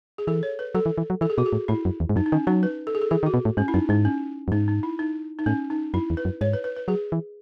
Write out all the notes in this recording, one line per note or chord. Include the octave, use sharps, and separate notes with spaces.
G#4
E3 A4
C#5
B4
F#3 A4
E3
E3
F#3
E3 A4
G#4
B2 F#4
G#4
A2
A2 E4
F#2
E2
G#2
F#2 D#4
D#4
D#3 C#4
F#3 D#4
B4
A4
G#4
A4
E3 G#4
D#3
F#4
B2
A2
G#2 C#4
E4
F#2 D#4
G#2 D#4
C#4
F#2
G#2 D#4
D#4
E4
D#4
D#4
A2 C#4
D#4
F#2 E4
E2
B4
F#2
G#2 C#5
B4
B4
B4
F#3 G#4
E3